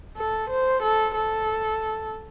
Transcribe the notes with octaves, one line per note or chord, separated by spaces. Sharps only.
A4
C5
A4
A4